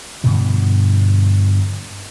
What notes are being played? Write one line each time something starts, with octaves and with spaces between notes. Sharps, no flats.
G2 B2 D3 F3